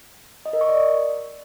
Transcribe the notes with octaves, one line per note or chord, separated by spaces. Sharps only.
D#5
A#4
C#6
D5